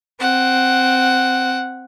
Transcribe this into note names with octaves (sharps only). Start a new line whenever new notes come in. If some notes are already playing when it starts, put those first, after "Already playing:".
C4 F#5